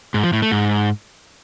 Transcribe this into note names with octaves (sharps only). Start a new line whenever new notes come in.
G#2
F3
A2
A3
G#2